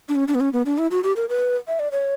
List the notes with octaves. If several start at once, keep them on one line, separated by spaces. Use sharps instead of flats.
D4
C#4
D4
B3
C#4
B3
D4
E4
F#4
G4
A#4
B4
E5
D5
C#5